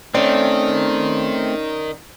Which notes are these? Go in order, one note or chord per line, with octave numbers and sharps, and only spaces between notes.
D#3 A3 C4 C#4 D5